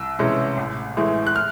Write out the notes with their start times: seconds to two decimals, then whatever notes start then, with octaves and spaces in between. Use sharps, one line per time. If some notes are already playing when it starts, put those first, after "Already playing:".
Already playing: C2 E6
0.19 C3 E3 G#3 C#4
0.57 A1
0.97 A2 E3 G#3
1.27 F#6
1.36 F6